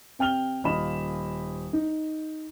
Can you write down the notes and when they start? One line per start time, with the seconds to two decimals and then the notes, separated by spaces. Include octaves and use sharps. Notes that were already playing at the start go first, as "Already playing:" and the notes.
0.19 C3 G5 F6 F7 G7
0.64 D#1 F4 D#5 B5 E7
1.73 D#4